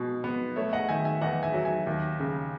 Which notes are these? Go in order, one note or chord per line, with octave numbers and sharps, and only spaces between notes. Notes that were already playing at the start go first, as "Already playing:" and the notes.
Already playing: B2 G#3
B3
A3 C#5 E5
D#5 F#5
D#3 E5 G#5
E5 G#5
E2 D#5 F#5
E5 G#5
F#3
E5 G#5
D#2
C#3